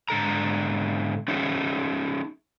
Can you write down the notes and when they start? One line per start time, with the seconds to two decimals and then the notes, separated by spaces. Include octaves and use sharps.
0.09 G#2 D3 A4 A#5
1.28 C#4 D#4 F#4 G#4 E5